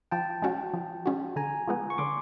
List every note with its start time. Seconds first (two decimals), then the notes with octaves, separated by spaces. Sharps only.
0.11 F3 G5 A5
0.42 G#3 C#4 F#4
0.74 F3
1.06 G#3 C#4 F#4
1.36 D3 G#5 A#5
1.67 F3 G#3 B3
1.90 C#6
1.98 D3 C6 D6